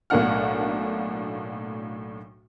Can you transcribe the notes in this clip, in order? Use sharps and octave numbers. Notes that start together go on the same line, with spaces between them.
B1 A2 A#3 D4 F#5 F6